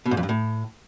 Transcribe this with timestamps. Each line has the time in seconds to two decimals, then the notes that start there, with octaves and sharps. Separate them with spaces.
0.06 B2
0.11 G#2
0.17 F2
0.23 G2
0.29 A2